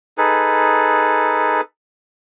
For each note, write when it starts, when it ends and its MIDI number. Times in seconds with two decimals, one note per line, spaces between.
0.18 1.61 63
0.18 1.61 68
0.18 1.61 69
0.18 1.61 71